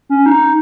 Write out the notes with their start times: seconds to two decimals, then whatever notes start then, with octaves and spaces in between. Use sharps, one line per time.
0.09 C#4
0.26 D#4